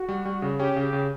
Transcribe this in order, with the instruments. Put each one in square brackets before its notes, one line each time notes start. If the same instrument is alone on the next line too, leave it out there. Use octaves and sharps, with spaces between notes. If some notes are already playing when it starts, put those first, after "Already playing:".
Already playing: [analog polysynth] F#4
[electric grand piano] G3
G3
C#3
[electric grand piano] C#4 [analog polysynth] G4
[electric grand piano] C#3
[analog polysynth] G4
[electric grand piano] C#3